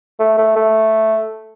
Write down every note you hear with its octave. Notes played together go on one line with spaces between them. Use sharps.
A3
A3
A3